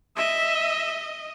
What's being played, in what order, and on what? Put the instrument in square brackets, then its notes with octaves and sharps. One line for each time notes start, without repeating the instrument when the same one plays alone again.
[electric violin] D#5 [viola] E5